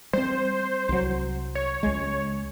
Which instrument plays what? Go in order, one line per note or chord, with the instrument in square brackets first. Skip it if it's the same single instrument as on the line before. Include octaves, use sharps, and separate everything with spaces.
[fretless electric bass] G3 C4 [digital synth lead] C5
[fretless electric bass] C2 F#3
[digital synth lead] C#5
[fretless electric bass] C#2 G#3